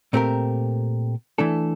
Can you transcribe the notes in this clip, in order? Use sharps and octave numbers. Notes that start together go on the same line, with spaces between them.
A#2 A3 C4 G4 A#4
E3 A3 D4 A4